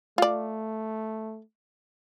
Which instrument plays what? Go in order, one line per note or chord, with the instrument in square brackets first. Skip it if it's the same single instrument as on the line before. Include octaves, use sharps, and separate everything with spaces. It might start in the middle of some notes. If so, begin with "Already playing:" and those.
[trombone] A3 [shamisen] F4 D5